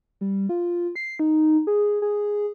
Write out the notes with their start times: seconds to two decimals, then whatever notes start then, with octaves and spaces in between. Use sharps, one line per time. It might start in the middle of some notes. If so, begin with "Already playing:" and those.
0.21 G3
0.49 F4
0.96 C7
1.19 D#4
1.67 G#4
2.02 G#4